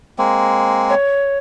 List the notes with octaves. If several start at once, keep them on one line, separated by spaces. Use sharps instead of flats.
G#3 A#3 C4
C#5